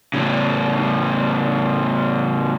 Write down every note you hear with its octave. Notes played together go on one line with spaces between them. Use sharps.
A2 C#3